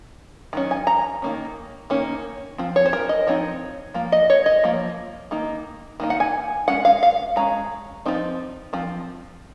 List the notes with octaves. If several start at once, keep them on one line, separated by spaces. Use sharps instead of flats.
D#3 F#3 C#4
G#5
A#5
D#3 A#3 C#4
D#3 A#3 C#4
F3 C4
C#5
C5
A#4
D#5
F3 C4 D#4 C#5
F3 A#3
D#5
C#5
D#5
F3 A#3
D#3 A#3 D#4
D#3 A#3 D#4
F#5
G#5
G#3 C#4 F#5
F5
F5
G#3 C#4 A#5
F3 C4 D#4
F3 C4